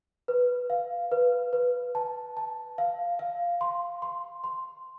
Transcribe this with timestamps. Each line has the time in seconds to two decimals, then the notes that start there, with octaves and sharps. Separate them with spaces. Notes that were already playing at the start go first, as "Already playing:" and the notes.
0.28 B4
0.70 F5
1.11 B4
1.53 B4
1.95 A5
2.37 A5
2.78 F5
3.19 F5
3.61 C6
4.02 C6
4.44 C6